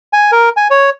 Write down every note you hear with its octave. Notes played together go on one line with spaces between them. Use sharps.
G#5
A#4
G#5
C#5